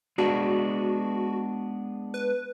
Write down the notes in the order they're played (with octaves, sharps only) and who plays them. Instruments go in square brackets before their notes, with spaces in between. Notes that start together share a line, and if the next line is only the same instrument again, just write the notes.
[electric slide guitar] G#3 B3 D4 [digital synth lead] F#4
[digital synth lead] B4